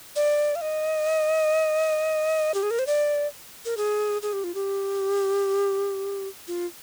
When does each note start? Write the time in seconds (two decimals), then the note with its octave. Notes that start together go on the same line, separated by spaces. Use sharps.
0.16 D5
0.55 F5
0.61 D#5
2.54 G4
2.63 G#4
2.71 A#4
2.79 C5
2.87 D5
3.65 A#4
3.77 G#4
4.22 G#4
4.33 G4
4.44 F4
4.54 G4
6.48 F4